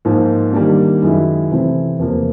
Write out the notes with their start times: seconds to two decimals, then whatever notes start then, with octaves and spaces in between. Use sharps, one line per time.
0.05 G#2 F3 A#3
0.53 D#3 G3 A#3 D4
1.02 F#2 D#3 G#3 C#4 E4
1.51 C3 E3 A3 C4 E4
1.99 E2 C3 F3 A#3